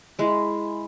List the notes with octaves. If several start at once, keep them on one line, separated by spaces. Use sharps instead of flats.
G#3 E4